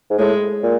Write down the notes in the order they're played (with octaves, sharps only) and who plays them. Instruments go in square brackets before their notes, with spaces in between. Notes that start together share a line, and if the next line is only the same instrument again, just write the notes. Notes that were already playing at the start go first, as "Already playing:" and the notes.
[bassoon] G#2
[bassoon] A2 [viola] G#3
[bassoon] A#2